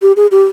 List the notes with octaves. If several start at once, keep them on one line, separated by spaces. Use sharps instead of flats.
G4
G#4
G4